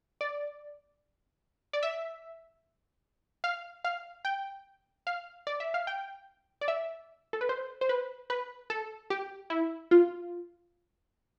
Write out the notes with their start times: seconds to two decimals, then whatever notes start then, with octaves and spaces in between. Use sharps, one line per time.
0.21 D5
1.73 D5
1.83 E5
3.44 F5
3.84 F5
4.25 G5
5.07 F5
5.47 D5
5.60 E5
5.74 F5
5.87 G5
6.61 D5
6.68 E5
7.33 A4
7.41 B4
7.49 C5
7.81 C5
7.89 B4
8.30 B4
8.70 A4
9.10 G4
9.50 E4
9.91 F4